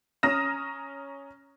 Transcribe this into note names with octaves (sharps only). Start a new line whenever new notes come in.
C#4 A#5 D#6 F6 A#6 E7